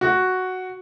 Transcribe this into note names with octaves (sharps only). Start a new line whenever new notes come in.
F#4